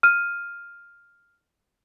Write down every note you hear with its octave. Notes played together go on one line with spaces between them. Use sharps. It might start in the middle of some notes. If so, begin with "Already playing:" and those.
F6 D#7